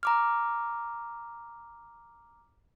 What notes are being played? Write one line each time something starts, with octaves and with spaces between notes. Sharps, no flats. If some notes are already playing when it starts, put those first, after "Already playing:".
A#5 D6 F6